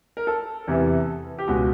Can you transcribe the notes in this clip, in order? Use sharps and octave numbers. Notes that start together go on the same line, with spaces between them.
A#4
A4
E2 C3 E3
G4
C#2 B2 G#3 F#4